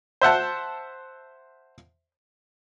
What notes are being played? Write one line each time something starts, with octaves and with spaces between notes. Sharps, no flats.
C5 E5 F#5 A5